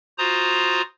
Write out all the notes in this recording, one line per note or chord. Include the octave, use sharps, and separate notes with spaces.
F4 F#4 C5 A#5 D#6